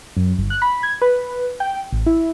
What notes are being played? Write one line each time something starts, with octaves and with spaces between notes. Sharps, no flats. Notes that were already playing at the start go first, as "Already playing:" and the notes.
F#2
G1
F#6
B5
G#6
B4
G5
A1
E4